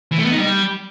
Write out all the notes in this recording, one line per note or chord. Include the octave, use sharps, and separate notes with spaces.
E3
A3
B3
D#4
G3